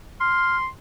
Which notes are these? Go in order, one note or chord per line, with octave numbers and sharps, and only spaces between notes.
C6 F6